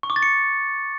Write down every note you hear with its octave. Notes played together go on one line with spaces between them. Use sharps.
C#6
D6
A6
C#7